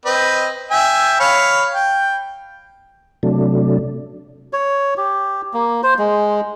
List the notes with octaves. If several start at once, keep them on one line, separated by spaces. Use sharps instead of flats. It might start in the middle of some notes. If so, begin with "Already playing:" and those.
C4 B4 D#5
E5 G5 G#5
C#5 F5 B5
G5
C3 F#3 A3 D4
C#5
G4
A#3
C5
G#3